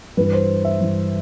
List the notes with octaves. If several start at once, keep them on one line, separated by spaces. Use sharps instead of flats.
G2 E3 B4
C5
E5
G2 E3